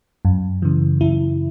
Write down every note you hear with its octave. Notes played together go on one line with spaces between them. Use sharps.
F#2
C#3 E3
F#2 E4